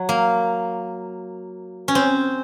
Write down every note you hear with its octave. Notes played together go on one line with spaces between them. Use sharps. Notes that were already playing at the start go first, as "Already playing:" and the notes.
Already playing: F#3
A#3
C#4
C4